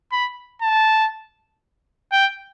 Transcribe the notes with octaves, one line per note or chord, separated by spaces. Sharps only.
B5
A5
G5